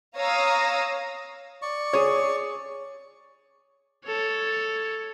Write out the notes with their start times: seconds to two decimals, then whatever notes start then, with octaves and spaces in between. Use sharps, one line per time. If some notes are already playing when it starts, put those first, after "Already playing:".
0.18 C#5 F5 A#5 D#6 E6 A#6
1.62 D5 C#6
1.93 G#4 C#5
4.06 A4 C#5